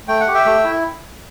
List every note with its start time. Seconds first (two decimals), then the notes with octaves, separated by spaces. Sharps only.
0.08 A3 G5
0.21 F#5
0.27 G4
0.34 E5 G5
0.46 A3
0.64 E4